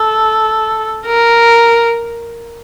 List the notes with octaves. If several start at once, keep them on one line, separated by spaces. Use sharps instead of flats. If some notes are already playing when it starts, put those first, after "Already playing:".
Already playing: A4
A#4